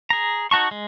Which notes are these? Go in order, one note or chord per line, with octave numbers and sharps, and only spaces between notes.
G#4 A#5
D#4 F#4 A5 C#6
G#3